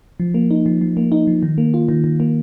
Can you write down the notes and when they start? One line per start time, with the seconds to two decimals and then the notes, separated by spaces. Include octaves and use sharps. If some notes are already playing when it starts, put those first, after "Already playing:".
0.20 F3
0.34 A#3
0.51 D#4
0.66 F3
0.81 F3
0.97 A#3
1.12 D#4
1.27 F3
1.43 D#3
1.58 A#3
1.74 F4
1.89 D#3
2.04 D#3
2.20 A#3